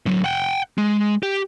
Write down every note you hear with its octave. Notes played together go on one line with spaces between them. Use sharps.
D3 F#3
F#5 G5
G#3
G4